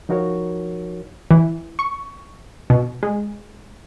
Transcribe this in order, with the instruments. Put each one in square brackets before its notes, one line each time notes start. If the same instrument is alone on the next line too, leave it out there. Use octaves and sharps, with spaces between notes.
[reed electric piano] F3 D#4 F#4 A#4 C#5
[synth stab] E3
C#6
B2
G#3